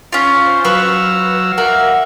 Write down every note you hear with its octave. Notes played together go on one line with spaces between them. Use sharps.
C#4 F4
C5
F#3 B4 F5 C#6 E6
A#3 F#4 E5